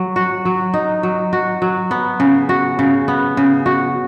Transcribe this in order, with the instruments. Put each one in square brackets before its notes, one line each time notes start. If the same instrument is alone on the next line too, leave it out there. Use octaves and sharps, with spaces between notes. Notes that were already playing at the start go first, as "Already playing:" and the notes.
Already playing: [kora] F#3
F#4
F#3
D#4
F#3
F#4
F#3
B3
C#3
F#4
C#3
B3
C#3
F#4